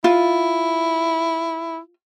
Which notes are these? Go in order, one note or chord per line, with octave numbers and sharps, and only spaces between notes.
E4 F4